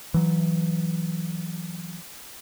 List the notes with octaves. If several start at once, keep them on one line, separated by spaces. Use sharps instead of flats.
E3 F#3